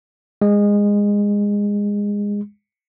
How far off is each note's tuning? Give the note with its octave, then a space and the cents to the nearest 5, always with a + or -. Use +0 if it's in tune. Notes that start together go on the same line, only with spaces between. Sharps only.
G#3 -20